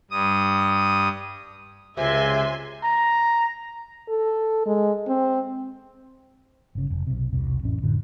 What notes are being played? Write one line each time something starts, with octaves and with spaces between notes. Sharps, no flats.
G2 D#6
C#2 C3 E5 G#5 C6
A#5
A4
G#3
C4
G1 C#3
F1
B1 C3
E1 C2 C3
A1 F2 C#4
F2 A2 D3